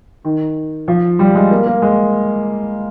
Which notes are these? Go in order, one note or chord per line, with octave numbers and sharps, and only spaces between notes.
D#3
F3
G3
G#3
A#3
A#3
G#3